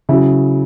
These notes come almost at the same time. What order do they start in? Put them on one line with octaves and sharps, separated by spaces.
C#3 E4 F#3